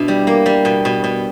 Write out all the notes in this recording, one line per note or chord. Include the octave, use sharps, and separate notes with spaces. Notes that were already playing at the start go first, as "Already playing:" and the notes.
Already playing: B2 D4 E4
G3
A#3
G3
B2
B2
B2